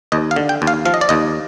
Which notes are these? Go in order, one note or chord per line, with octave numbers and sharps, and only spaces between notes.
D#2 D#5
F5
D3
G5
D#2
F5
F3 F5
D#5
D5
D#2 D#5